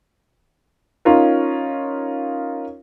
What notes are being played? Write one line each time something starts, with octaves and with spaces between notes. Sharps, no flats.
C#4 D#4 F4 A#4